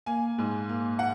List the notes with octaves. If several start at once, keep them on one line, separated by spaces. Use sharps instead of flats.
A#3 G#5
G#2
A#3
F#5